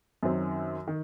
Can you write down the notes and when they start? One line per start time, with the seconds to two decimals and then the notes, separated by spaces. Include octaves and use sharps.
0.23 F#2 D#3 F#3 C4
0.88 D#3